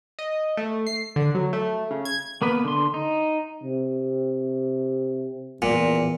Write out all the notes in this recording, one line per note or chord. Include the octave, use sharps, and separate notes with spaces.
D#5
A3
C7
D3
F#3
A3
C#3
G#6
A#3 B3 B4
D3 C6
D#4
C3
E2 A#2